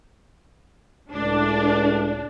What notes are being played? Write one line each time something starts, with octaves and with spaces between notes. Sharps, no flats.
C#2 A2 D4